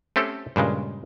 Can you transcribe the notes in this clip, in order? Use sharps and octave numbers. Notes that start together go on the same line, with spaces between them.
A3 C4 C#4 G4 A4
G2 A#2 C#3 G#3